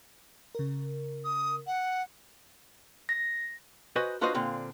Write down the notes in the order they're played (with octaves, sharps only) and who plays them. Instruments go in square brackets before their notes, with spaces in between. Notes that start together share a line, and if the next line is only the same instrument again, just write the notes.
[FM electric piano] C#3 A#4
[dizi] D#6
F#5
[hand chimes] A#6
[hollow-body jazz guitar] F#4 B4 C5 D#5 G#5
D4 F4 F#4 B4 C5 D#5
A#2 D3 C4 F4